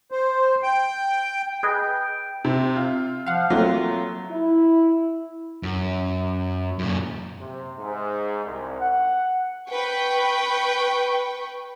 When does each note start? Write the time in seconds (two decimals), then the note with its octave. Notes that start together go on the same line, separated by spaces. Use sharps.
0.11 C5
0.63 G5
1.63 G#4 B4 D#5 G5
2.45 C3 C4
2.76 F4
3.26 F3 F5 F#5
3.50 F#3 A3 A#3 C4 F4
4.31 E4
5.63 F#2
6.79 F#2 A#2
7.39 C3
7.78 G#2
8.45 C2
8.81 F#5
9.70 B4 G5 C#6